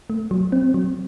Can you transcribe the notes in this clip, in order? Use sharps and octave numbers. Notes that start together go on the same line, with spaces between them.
A3
F#3
C4
F#3